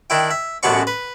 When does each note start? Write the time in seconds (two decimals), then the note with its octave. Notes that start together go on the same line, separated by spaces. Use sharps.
0.10 D#3 D4 E4 G5
0.31 E5
0.63 A1 F#2 B2 B3 D4 C#6
0.87 B4